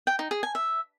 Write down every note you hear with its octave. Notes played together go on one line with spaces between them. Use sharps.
G5
D#4
G#4
G#5
E5